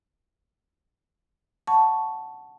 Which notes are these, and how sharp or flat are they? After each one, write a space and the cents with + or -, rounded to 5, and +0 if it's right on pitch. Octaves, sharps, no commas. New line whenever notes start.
F#5 +0 A5 +0 C#6 +0